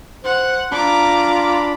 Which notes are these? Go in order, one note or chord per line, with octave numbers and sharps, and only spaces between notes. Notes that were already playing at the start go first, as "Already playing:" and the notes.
C5 F#5
D4 F4 A#5 B5 D6